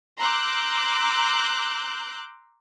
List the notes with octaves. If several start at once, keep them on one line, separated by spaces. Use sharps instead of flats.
A#5 C6 D6 E6 F#6 G6